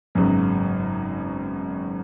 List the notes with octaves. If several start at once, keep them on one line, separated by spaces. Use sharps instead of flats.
G#1 F#2 C#3 F#3 B3